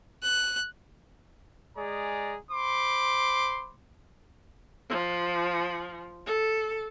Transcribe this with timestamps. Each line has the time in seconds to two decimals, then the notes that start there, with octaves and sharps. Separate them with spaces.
0.23 F#6
1.76 G#3 G#4 D5 A#5
2.51 C5 B5 C6 D6
4.90 F3
6.26 A4